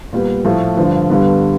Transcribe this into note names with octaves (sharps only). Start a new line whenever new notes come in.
A#2 G3 B3
A2 F3 A3
G2 D3 F3
G2 D3 G3 B3